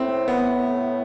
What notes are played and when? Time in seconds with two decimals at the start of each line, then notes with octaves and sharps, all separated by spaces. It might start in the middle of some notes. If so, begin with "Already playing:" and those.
Already playing: A2 C4
0.28 B3